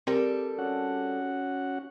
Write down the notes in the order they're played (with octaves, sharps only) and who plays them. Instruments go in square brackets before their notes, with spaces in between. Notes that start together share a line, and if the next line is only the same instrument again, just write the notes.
[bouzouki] G3 A4 [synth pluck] C4 G4 A#4
[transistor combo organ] C#4 F#4 F#5